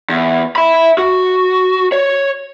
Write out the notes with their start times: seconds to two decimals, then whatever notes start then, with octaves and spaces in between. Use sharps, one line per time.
0.09 E2
0.56 E5 B5
0.98 F#4
1.92 C#5